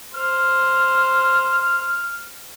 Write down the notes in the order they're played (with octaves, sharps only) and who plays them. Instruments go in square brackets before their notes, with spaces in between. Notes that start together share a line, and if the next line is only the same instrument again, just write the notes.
[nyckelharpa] C5 [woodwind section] F6